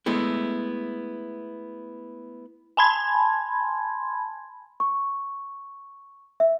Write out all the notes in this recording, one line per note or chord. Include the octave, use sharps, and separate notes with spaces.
G#3 A3 B3 E4
G#5 A5 B5 C6 G#6
C#6
E5